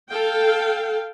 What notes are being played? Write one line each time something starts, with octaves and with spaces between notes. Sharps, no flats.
A4 F5 G5